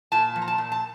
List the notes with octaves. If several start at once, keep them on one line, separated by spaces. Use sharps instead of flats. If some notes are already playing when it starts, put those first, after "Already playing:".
A#2 A5
F3
A#5
A5
A#2
A5